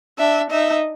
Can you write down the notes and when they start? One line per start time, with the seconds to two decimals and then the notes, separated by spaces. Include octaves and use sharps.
0.18 D4 E5
0.51 D#4 E5